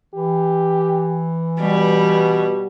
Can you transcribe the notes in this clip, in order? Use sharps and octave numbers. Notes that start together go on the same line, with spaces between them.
E3 G4
B2 G3